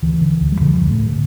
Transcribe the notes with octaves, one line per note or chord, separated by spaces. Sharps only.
D2 E3
D3
D2
G3
F2 D3 F3
D2
A2 A3
D3